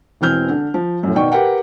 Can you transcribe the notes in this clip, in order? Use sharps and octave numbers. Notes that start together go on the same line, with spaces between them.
E1 E3 C4 F6 G6
D3
F3
F#2 A2
B2 D#3 D5 G5 C#6
G4 A#4 B4 F#5 G5